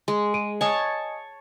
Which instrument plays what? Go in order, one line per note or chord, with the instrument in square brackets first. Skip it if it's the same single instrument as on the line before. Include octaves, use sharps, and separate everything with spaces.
[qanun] G#3
[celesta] G#4 D7 D#7
[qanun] C#5 A5 [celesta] D#5 G#5 D#6